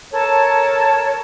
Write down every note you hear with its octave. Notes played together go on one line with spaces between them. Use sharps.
A4 A#4 C#5 A5